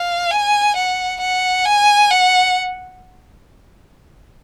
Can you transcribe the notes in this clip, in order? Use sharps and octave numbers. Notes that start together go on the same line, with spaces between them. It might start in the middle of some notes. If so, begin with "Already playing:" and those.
Already playing: F5
G#5
F#5
F#5
G#5
F#5